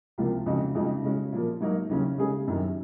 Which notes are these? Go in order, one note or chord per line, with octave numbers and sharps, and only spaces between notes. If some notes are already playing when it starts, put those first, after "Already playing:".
C#2 C3 F3 A#3 F4
F2 C#3 G#3 D#4 F#4
F2 C#3 F3 G#3 D#4
C#3 G#3 C#4 F#4
A#2 F3 A#3
G#2 F#3 A#3 D#4 A#4
D#2 C#3 F#3 C#4
C#3 G#3 D#4 G#4
F#2 D#3 F#3 C#4